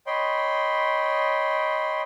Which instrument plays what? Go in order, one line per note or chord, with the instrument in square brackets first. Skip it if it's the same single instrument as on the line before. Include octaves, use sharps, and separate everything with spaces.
[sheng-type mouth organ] C#5 D#5 G5 B5 C6